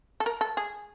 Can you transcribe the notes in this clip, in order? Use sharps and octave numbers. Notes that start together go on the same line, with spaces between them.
A4
A#4
A4
G#4